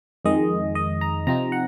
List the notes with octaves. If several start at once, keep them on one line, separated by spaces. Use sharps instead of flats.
F2 D#3 G#3 D#5
D#5
A#5
C3 F3 C4 D#4 A#5
F#5